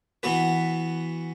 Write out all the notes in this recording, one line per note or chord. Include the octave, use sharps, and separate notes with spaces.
E3 B3 F#4 B4